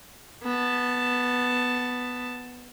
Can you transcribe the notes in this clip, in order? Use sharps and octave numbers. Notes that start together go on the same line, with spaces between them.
B3 A5